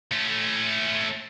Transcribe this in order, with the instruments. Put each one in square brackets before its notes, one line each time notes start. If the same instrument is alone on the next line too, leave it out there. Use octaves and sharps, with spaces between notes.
[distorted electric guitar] A3 C#4